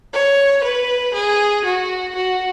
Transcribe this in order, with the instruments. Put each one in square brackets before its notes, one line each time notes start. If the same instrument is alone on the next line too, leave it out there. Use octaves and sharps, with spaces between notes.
[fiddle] C#5
B4
G#4
F#4
F#4